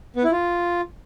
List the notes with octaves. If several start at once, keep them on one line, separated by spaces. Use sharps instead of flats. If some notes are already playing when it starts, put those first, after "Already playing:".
B3
E4
F4